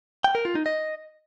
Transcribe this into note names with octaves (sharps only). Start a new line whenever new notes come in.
G5
A#4
F4
D#4
D#5